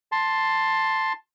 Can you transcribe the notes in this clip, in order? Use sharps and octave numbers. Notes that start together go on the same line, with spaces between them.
A5 C6